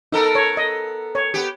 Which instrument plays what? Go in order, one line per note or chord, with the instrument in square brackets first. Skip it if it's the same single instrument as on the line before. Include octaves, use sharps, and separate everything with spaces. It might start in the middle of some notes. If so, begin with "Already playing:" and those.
[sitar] B3 A4 A#4 [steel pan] D#4
[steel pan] C#5
D#5
C#5
[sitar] B3 G4